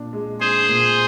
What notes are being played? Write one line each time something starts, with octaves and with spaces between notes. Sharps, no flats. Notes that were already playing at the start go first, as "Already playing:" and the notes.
Already playing: A#2 D4
G#3
D4 G#4 C5
A#2